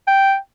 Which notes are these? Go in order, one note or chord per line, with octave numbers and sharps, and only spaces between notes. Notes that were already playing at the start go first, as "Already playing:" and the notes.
G5